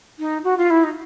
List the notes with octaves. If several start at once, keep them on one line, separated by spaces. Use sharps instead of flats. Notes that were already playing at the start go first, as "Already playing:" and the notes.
D#4
F#4
F4
E4
D#4